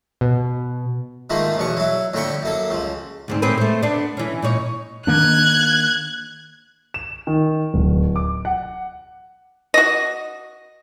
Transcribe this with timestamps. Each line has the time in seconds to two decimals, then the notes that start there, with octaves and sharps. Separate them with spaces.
0.21 B2
1.30 G#2 D#3 F3 A3 A#3
1.57 B1 E2 B2 C#6
1.77 F#3 E4
2.13 F2 A2 D3 G5 B5 C#6
2.43 F#2 A#3 A4
2.70 C#2 F3
3.28 D2 G#2 C4
3.42 A2 C4 B4
3.58 A3 C5
3.83 B3 D4
4.17 E3 C#4
4.42 A#2 D#4 C#5
5.07 D#3 A#3 D4 F#6 G#6
6.94 E7
7.27 D#3
7.74 D1
8.16 D6
8.45 F#5
9.74 F#4 D#5